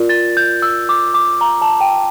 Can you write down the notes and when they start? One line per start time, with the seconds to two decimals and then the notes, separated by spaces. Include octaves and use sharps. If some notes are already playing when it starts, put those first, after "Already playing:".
Already playing: F4 A#4 D5
0.09 A6
0.37 G6
0.62 E6
0.89 D6
1.14 D6
1.41 A#5
1.62 A5
1.81 G5